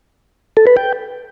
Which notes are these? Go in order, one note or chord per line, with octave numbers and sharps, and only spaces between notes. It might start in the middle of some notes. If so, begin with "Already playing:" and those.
A4
B4
G5